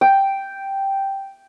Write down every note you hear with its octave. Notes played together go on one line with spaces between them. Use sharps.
G5